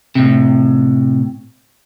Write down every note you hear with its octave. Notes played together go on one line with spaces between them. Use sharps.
A2 C3